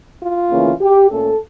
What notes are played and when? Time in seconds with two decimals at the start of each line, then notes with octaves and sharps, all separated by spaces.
0.21 F4
0.50 D2 C#3 E3 A#3 C#4
0.81 G4
1.10 A#2 A3 C#4 A4